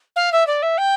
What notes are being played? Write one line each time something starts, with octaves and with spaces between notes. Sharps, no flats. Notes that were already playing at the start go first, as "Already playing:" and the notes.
F5
E5
D5
E5
G5